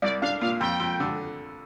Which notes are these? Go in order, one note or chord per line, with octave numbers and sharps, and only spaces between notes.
C2 D5
D4 F5
A#2 F5
F2 G5
F2
D3